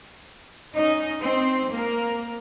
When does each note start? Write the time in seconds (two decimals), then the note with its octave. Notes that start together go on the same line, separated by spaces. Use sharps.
0.73 C#4 D#4 D#5
1.24 C4
1.71 A#3 A#4